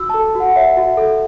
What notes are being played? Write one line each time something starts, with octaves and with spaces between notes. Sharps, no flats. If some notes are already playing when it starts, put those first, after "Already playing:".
Already playing: F#4 E6
A4 A5
F#4
F#5
C#5 E5
F#4
A4